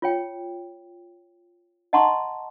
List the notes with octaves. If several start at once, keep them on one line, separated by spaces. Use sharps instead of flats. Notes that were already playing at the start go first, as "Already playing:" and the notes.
F4 C#5 G5
D#5 F#5 A5 A#5 C6 C#6